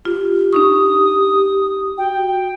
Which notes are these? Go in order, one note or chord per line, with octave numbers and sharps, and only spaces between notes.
F4 G4
D4 D#4 C#6 D#6
F#4 G5